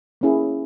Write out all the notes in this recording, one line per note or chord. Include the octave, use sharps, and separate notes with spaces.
A#3 C#4 E4 G#4